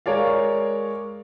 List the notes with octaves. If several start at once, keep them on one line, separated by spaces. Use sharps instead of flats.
G#3 A#4 C#5 D5 F5